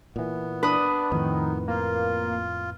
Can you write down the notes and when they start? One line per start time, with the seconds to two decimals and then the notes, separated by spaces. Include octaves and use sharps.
0.16 A#2 E3 B3
0.63 D4 B4 D#6
1.12 F2 A2 D#3
1.68 A#3 F4